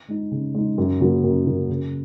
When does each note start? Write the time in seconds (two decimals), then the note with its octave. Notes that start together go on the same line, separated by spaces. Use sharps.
0.08 G#3 D#4
0.31 C#3
0.54 G#3 D#4
0.78 F#2
1.00 C#3 F#3 A#3
1.24 F#2
1.46 C#3 F#3 A#3
1.69 C#3